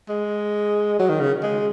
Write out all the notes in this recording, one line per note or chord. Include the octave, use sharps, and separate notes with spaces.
G#3
F#3
D#3
C#3
G#3